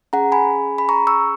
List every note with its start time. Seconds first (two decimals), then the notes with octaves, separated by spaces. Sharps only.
0.13 C#4 G#4 F#5 A#5
0.32 G#5 B5
0.78 B5
0.89 A#5 C#6
1.07 C#6 E6